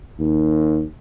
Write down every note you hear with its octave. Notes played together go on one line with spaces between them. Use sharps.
D#2